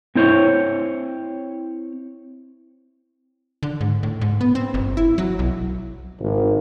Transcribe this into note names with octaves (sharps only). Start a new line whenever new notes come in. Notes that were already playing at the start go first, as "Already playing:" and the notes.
C4 E4 C5 C#5
D3
G#2
A2
G#2
B3
C4
G1
E4
F#3
B1
G#1